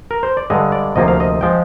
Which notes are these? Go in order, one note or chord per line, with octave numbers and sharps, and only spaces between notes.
A#4
C5
D5
G2 D3 G#3 D#5
D5
D2 C3 F3 A#3 D#5
F5
D#5
F3 G#3 G5